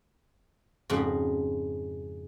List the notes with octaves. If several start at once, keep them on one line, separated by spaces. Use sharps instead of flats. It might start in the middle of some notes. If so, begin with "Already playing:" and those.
F2 G#2 C#3 F#4